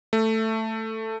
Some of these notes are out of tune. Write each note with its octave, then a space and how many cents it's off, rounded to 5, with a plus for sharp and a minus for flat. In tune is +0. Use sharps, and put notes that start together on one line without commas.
A3 +10